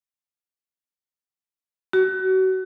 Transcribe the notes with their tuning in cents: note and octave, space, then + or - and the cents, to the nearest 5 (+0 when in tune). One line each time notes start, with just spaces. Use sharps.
F#4 +30